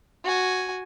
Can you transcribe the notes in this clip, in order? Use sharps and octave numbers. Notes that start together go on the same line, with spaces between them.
F#4 G#5